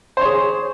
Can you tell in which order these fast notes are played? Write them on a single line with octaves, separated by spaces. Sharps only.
C5 C#5 G#4